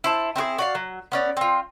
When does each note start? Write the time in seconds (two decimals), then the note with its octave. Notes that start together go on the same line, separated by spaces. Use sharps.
0.04 E4 C5 A5
0.36 C4 E4 F#4 G#4
0.58 F#4 D5 F5
0.75 F#3
1.12 B3 C#4 D5
1.37 C4 F4